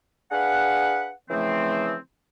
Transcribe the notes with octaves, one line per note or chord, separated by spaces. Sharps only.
D4 G#4 B4 F5 F#5
C#3 E3 F3 A3 C4